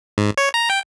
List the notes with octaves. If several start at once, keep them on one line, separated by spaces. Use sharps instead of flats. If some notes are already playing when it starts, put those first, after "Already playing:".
G#2
C#5
A#5
G5